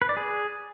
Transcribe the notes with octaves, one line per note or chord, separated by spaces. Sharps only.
B4
D5
G#4